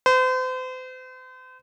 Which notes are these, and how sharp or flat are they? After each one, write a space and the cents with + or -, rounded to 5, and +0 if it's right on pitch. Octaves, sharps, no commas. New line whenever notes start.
C5 -40